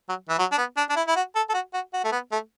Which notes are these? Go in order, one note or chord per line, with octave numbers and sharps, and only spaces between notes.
F#3
E3
F#3
D4
B3
D4
D4
E4
E4
F#4
A4
A4
F#4
F#4
F#4
A3
B3
A3